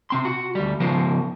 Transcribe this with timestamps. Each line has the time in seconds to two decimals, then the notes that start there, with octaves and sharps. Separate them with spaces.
0.10 C3 C4 C6
0.25 F#4
0.55 D2 G3
0.80 C#3 F3 B3 A#4 C5